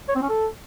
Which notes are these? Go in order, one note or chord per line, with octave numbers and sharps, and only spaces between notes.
C#5
C4
C#4
A4